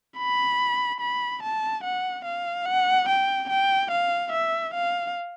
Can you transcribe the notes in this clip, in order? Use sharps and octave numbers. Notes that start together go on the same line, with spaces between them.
B5
B5
A5
F#5
F5
F#5
G5
G5
F5
E5
F5